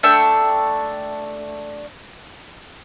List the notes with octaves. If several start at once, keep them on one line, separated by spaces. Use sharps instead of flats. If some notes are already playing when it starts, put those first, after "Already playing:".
A3 D4 E5 G5